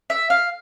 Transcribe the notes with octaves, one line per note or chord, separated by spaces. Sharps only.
E5
F5